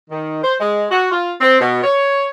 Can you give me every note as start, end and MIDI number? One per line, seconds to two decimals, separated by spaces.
0.10 0.42 51
0.43 0.54 72
0.60 0.85 56
0.91 1.11 66
1.12 1.32 65
1.41 1.58 60
1.61 1.83 47
1.84 2.26 73